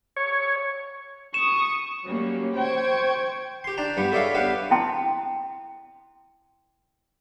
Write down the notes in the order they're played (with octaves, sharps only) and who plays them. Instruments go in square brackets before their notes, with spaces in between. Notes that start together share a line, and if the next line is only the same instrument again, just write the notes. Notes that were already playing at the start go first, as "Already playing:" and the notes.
[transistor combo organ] C#5
[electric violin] C#6 D#6 [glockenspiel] E7
[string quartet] F#3 G3 A#3 C#4
C5 G5 C#6 G#6
[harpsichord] G4 C6
D4 G5 A5 A#5
G2 G3 B3 G4
G#4 A4 C#5 D5 E5 F5
B3 D4 G4 B4 F5
[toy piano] E4 G5 A5 C6